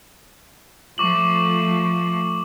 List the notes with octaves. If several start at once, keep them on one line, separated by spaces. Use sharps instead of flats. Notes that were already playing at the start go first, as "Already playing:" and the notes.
F3 A3 C#6 D6 F#7